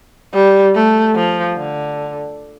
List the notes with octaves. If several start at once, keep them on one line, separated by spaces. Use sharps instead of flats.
G3
A3
F3
D3